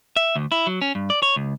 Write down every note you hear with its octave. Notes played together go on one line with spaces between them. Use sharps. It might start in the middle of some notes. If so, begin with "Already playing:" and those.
E5
D2
E4
F#3
C#4
G2
D5
C#5
C#2